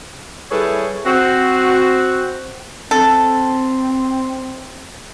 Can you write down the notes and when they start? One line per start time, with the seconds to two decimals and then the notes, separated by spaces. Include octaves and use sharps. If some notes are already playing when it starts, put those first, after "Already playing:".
0.51 G3 E4 G#4 A4 B4 C#5
1.06 C4 F#4
2.91 C4 A4